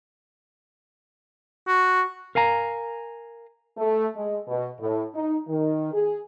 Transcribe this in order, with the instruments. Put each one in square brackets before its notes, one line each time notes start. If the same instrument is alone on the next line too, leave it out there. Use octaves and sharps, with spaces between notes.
[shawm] F#4
[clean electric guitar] A#4 F5 G#5 A#5
[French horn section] A3
G#3
B2
A2
D#4
D#3
G#4